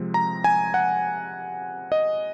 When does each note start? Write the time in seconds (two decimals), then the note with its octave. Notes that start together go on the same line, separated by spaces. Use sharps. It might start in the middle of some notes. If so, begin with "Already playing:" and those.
Already playing: C3 F3 G#3 C4
0.14 A#5
0.44 G#5
0.74 F#5
1.92 D#5